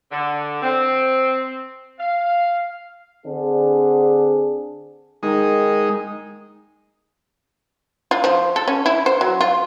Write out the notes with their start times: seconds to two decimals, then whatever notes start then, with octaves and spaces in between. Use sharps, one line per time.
0.12 D3
0.62 C4
1.99 F5
3.26 D3 C4 D4 G#4
5.23 D#3 G#3 D#4
8.11 F4
8.24 F3
8.56 A4
8.68 C#4
8.86 E4
9.06 C5
9.21 F#3
9.41 F4